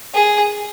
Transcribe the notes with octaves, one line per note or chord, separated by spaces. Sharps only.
G#4